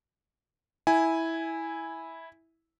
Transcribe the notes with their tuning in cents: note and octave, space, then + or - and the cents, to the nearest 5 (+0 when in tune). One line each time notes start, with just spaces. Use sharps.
E4 -10 G#5 -5